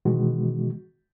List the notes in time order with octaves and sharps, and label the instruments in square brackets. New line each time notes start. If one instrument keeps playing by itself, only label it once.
[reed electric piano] B2 D#3 E3 G#3 B3 F#4